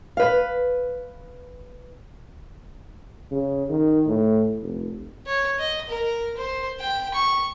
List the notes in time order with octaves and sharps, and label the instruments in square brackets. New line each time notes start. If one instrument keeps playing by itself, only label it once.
[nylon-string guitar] B4 F5
[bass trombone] C#3
D#3
A2
F1
[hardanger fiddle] C#5
D#5
A#4
C5
G5
C#6